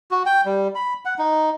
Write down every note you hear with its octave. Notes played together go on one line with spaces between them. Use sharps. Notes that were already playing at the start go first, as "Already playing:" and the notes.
F#4
G5
G3
B5
F#5
D#4